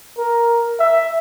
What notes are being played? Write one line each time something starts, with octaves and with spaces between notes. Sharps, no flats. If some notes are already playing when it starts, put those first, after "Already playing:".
A#4
E5